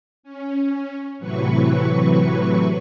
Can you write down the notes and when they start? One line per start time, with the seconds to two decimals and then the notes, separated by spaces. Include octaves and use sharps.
0.23 C#4
1.19 A2 C3 E3 F#3 B4 C#6